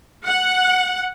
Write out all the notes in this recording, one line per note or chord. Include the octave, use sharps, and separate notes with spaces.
F#5